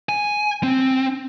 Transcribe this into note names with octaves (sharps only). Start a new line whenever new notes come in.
G#5
C4